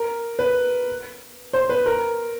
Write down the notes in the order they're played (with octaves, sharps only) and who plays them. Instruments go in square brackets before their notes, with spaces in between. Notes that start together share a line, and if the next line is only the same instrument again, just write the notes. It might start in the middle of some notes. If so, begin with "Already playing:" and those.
Already playing: [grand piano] A#4
B4
C5
B4
A#4